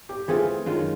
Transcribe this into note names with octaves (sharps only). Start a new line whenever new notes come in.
G4
E3 A3 C4 F4 G#4
F#2 D#3 G#3 C#4 F4